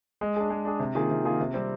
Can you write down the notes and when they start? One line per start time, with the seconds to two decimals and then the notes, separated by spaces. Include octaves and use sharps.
0.21 G#3
0.36 D4 G#4
0.50 G#3
0.65 D4 G#4
0.79 C3
0.95 D#3 A#3 F4 G#4
1.10 C3
1.25 D#3 A#3 F4 G#4
1.40 C3
1.54 G3 C4